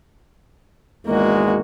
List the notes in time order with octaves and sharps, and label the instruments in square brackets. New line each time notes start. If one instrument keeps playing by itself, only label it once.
[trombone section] G#1 E2 G#3 [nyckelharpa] A#3 F#4